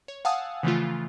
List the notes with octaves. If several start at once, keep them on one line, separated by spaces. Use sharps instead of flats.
C#5
F5 F#5 G#5 A5 D#6 E6
C#3 E3 F3 A3 F4